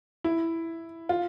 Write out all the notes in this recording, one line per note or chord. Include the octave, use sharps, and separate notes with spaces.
E4
F4